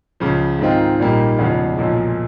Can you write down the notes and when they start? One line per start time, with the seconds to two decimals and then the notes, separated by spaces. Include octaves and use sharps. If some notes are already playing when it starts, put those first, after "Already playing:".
0.20 C#2 C#3 F3
0.59 G#2 D#3 G#3 C4 F4
0.99 A#1 A#2 G3 A#3 D#4
1.39 E1 E2 C#3 F3 G#3
1.78 B1 A#2 F3 G#3